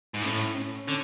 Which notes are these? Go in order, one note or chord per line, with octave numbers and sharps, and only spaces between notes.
G#2
A2 C#4
C#4
D3 C#4